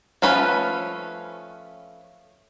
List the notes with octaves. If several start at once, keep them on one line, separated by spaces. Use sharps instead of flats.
F3 A3 C#4 B4